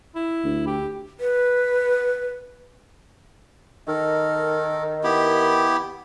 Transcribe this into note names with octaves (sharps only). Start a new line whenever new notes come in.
E4
D2
G4
B4
D#3 A4 A#4
B3 E4 G4